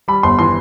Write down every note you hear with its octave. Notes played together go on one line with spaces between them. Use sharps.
G3 B5
G1 C6
E3 C6